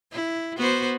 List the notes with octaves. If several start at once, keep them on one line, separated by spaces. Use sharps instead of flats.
E4
B3 F#4 C5